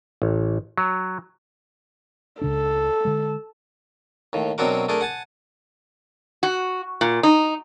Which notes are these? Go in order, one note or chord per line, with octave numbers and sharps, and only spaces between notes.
A1
F#3
C#2 C#3 D4 A4
D3 G#3
D#2 A2
B2 F#3 C4 D4 F#4 A#4
A3 D4 G#4 A#4
F#5 G#5 A5
F#4
A#2
D#4